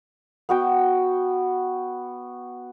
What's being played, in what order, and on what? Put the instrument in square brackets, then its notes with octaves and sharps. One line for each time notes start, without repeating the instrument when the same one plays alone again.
[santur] B3 F#4 G5